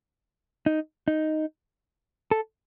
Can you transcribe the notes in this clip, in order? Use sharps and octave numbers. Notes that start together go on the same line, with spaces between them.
D#4
D#4
A4